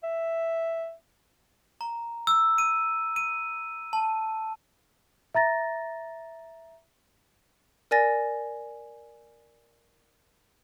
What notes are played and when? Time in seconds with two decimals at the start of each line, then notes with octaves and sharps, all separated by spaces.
0.04 E5
1.81 A#5
2.27 E6
2.58 D#7
3.16 D#7
3.93 A5
5.35 E5 A#5 A6 A#6
7.91 A#4 D5 G#5 A6 A#6